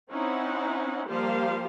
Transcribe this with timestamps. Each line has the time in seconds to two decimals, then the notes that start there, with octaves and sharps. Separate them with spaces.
0.11 C4 C#4 D#4 E4 F#5
1.08 F3 G3 A#3 G4 C5 F5